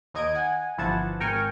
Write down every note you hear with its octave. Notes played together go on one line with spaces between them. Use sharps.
D#2 D#4 D#5 G#6 D7 D#7
F#5 G#5
G1 E3 F3 F#5 A5 G#6
G#1 A#4 G5 G#5 C#6 F6